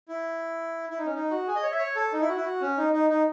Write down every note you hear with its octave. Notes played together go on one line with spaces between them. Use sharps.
E4
E4
D#4
C#4
D#4
F#4
G#4
D#5
C#5
E5
C#5
A4
D#4
E4
F#4
E4
F#4
C#4
D#4
D#4
D#4